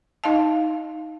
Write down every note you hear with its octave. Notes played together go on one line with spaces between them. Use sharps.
D#4 D#5 F5 A5